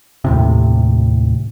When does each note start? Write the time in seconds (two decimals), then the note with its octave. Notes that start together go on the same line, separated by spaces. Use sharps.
0.25 D#2 A2 C3